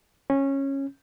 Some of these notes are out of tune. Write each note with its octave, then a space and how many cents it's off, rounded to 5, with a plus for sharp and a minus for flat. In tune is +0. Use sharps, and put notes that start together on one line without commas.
C#4 -15